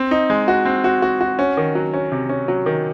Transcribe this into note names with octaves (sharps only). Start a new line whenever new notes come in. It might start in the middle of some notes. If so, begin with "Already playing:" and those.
Already playing: C4
D#4
G#3
F#4
C4
F#4
F#4
F#4
C#4
D#3
F#3
C#4
C3
C#4
F#3
D#3